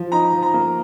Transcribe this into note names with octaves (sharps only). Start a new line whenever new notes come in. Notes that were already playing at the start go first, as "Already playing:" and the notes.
Already playing: F3
D#4 A#5
F3
A#5
A#3